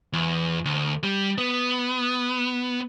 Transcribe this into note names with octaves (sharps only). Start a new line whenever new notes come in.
E2
D2
G3
B3